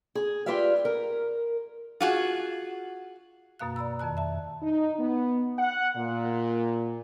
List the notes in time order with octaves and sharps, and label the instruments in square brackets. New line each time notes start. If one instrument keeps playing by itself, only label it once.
[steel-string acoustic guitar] G#4
F4 G4 B4 D5 E5 F5
A#4
[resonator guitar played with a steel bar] F4 F#4 G#4
[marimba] F#2 B2 A#3 F5 F#6
D5 A#5 B5 E6
F2 D#3 D5 A5 F#6
E5 A5
[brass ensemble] D#4
B3
F#5
A#2